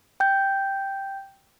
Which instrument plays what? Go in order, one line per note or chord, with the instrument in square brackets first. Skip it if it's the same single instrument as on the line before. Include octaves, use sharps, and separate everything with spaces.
[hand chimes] G5 G6